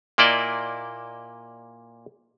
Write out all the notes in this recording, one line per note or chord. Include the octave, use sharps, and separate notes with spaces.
A#2 A#3 E4 D5 D#5